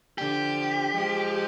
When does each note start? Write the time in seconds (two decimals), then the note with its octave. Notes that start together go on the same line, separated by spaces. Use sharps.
0.18 D3 F3 G4
0.94 F3 G#3